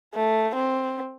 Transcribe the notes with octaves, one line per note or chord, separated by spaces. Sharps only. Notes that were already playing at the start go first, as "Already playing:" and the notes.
A3
C4